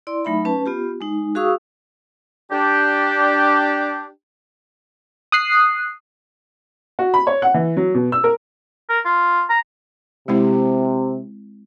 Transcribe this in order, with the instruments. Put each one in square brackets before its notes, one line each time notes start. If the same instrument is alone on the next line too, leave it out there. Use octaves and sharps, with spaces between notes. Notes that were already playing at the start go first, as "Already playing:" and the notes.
[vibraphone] E4 D5 C6
F#3 A3 D#4 E5 B5
C#4 B4 A5
B3 F4 G4
G#3 D#4
F#4 G#4 F5 C#6 D#6 E6
[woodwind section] D4 G4
[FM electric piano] D#6 F#6 C7
[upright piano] F#4
B5
C#5
F#5
E3
F#3
B2
E6
A#4
[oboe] A#4
F4
A#5
[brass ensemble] C3 [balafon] G#3 C4 E4